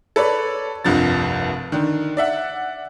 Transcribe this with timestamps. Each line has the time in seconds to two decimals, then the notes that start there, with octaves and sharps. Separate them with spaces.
0.16 A4 B4 C#5 D5
0.85 F1 C2 G2 F3 A6
1.72 D3 D#3
2.17 D5 E5 F#5